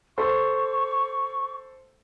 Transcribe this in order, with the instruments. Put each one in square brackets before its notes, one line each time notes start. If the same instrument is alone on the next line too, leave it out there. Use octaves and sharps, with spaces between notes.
[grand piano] A4 C5 [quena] C#6